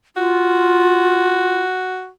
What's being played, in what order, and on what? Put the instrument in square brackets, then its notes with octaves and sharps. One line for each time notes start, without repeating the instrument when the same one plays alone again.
[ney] F4 [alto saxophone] F#4